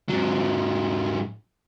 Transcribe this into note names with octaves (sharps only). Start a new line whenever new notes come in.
G#2 F#3